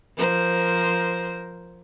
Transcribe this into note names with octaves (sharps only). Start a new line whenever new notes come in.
F3 A#4 C5